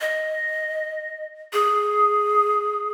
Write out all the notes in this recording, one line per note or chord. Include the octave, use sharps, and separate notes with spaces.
D#5
G#4